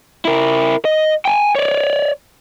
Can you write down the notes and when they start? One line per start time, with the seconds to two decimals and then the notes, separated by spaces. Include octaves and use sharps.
0.25 E4 A#4
0.85 D#5
1.25 G5 G#5
1.55 C#5 D5